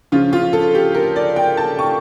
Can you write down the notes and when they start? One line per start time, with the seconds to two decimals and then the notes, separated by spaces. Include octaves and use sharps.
0.12 C#3 F3 C#4 F4
0.33 F4
0.53 A4
0.75 G4
0.95 A#4
1.16 D5
1.36 G5
1.57 A5
1.79 C#6